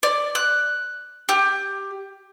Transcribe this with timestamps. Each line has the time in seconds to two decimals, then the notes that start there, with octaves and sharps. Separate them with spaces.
0.03 D5
0.35 F#6
1.29 G4